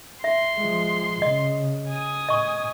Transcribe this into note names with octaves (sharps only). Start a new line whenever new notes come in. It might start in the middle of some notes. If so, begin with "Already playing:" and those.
E5 C6
F3 G#3
C#3 D#5
G#5 D#6
A2 D#5 C#6